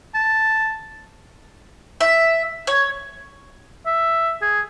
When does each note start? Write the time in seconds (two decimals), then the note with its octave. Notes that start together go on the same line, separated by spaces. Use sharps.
0.15 A5
2.01 E5
2.67 C#5
3.86 E5
4.42 G#4